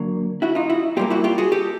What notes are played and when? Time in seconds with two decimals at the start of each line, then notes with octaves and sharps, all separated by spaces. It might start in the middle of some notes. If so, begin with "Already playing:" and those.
Already playing: D3 F#3 A#3
0.42 E4 F#4
0.55 D#4 F4
0.70 E4 F#4
0.97 A#2 G3 A#3 F4 G4
1.10 E4 F#4
1.24 F4 G4
1.38 F#4 G#4
1.52 G4 A4